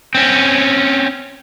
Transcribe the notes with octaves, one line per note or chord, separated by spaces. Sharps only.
C4 C#4